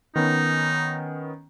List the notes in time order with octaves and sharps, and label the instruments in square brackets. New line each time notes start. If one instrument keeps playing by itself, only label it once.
[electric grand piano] D#3 B3 C#4 [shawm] D#4